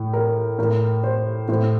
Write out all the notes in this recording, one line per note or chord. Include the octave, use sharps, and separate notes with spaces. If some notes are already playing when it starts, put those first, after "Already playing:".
Already playing: A2
A#4
A2 A#4
C5
A2 C5